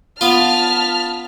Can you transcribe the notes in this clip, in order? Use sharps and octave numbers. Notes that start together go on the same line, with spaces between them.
B3 F4 A5 F6 B6